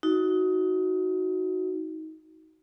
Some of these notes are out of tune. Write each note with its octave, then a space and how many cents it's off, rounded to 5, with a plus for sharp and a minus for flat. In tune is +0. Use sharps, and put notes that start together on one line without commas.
D#4 +25 F#4 +0